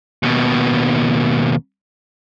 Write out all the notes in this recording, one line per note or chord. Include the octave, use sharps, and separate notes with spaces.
D#2 B2